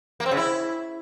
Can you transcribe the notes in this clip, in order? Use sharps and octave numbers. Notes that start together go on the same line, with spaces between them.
A#3
C4
C#3
E4